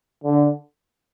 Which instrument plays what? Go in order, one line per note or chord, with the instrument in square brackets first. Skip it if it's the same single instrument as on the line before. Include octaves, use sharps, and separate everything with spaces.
[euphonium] D3